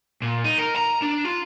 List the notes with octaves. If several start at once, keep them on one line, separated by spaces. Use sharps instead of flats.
A#2
D#4
A#4
A#5
D4
F4